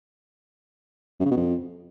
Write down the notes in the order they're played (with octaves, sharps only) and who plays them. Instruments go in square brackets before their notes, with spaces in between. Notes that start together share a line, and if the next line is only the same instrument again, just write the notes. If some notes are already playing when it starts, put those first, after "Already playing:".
[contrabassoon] F#2
C#3
B2
F2